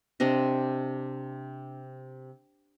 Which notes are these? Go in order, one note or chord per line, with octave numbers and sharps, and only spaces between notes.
C3 C4 D4 D#5